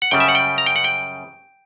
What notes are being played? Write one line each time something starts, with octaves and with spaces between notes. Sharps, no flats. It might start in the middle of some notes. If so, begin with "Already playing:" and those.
F#5
F#2 C#3 G3 G5
E5
F#5
G5
A#5
G5
F#5
G5